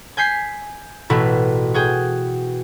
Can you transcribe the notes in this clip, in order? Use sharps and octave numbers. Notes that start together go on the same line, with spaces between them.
G#5 G6 B6 C7
A1 B2 E4 F#4
F#4 G#4 G5